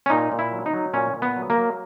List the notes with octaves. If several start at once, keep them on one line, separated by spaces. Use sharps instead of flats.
C#4
A#2 D#4
A#2
E4
F#3
D#4
F#3
A#2 C#4
A#2
B3
F#3
A#3
F#3